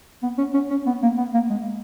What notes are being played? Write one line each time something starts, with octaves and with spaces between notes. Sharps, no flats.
B3
C#4
C#4
C#4
B3
A#3
B3
A#3
G#3